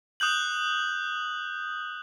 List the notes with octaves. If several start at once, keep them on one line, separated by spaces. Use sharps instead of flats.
D#6 F#6 G6 F#7